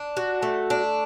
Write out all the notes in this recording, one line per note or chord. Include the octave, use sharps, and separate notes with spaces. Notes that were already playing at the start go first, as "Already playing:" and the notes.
Already playing: D4
F#4
A3
D4